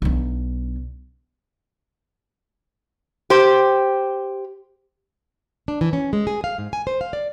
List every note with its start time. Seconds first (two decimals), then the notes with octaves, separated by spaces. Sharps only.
0.02 B1 D4
3.30 G4 C5
5.68 D4
5.81 E3
5.93 C#4
6.13 G#3
6.27 G#4
6.44 F5
6.58 G#2
6.73 G#5
6.87 C5
7.01 F5
7.13 D5